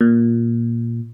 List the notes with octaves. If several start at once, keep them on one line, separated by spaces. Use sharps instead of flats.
A#2